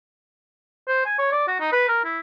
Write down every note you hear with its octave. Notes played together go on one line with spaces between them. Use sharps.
C5
G#5
C#5
D5
F#4
D#4
B4
A#4
E4